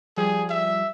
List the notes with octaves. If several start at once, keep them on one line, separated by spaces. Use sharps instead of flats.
F3 G3 G#4
E5